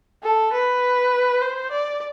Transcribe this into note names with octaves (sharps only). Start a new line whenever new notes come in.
A4
B4
C5
D5